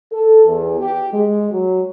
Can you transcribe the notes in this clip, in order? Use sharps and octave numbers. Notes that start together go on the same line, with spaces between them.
A4
E2
G4
G#3
F#3